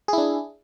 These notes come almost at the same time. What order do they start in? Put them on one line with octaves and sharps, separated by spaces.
G#4 E4 D4